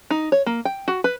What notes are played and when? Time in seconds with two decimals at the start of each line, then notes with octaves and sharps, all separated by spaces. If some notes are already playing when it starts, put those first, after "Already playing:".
0.10 D#4
0.32 C#5
0.46 A#3
0.65 G5
0.88 F#4
1.04 B4